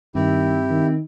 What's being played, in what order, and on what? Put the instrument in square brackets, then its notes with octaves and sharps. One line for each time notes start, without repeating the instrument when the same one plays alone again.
[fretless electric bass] G2 [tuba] D#3 [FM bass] C4 [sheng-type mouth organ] E4 G4
[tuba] D#3